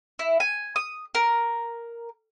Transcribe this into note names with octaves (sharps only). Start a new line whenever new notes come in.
E4
G#5
D#6
A#4